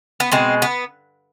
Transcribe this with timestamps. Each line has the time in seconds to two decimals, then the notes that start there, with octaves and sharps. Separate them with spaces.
0.20 B3
0.32 B2 G#3 C4
0.62 B3